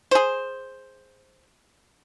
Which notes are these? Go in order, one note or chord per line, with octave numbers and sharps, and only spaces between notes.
G#4 C5